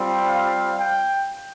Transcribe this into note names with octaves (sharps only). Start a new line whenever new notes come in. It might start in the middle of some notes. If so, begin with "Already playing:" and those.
Already playing: G3 C4 F4
F5
G5